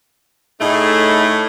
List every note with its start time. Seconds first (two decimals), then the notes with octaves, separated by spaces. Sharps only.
0.61 A2 A3 D#4 G#4